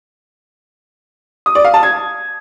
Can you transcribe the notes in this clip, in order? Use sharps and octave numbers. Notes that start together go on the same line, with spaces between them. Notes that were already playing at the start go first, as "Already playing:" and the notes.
D#6
D5
F5
A5
G#6